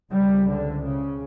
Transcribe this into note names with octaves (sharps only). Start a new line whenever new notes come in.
C#2 C3 G3
D3
C#3